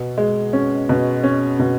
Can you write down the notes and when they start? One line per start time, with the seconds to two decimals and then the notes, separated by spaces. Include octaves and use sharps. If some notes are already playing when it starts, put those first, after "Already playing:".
Already playing: B2
0.18 G#3
0.53 C#4
0.89 B2
1.24 C#4
1.59 B2